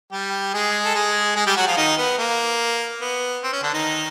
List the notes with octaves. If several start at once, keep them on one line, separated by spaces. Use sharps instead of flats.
G3 G4
G#3 G#4
A4
G#3 G#4
G#3 G#4
G3 G4
F#3 F#4
F3 F4
D#3 D#4
B3
A#3
B3
C4
C#4
D3 D4
D#3 D#4